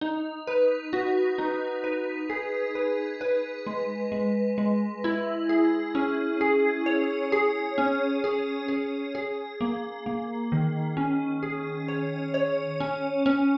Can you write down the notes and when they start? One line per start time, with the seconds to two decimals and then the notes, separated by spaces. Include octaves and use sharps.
0.01 D#4
0.47 B4
0.93 F#4
1.39 D#4
1.84 B4
2.30 G#4
2.75 B4
3.21 B4
3.66 G#3
4.12 G#3
4.58 G#3
5.04 E4
5.49 G#4
5.95 C#4
6.41 G#4
6.86 C#5
7.32 G#4
7.78 C#4
8.24 G#4
8.68 G#4
9.15 G#4
9.61 A#3
10.06 A#3
10.52 D#3
10.97 C#4
11.43 G#4
11.88 C#5
12.34 C#5
12.80 C#4
13.26 C#4